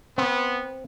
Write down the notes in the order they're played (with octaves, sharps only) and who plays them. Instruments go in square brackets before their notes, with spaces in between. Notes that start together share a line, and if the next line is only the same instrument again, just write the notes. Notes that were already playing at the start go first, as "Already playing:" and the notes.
[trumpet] B3 [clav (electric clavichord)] C4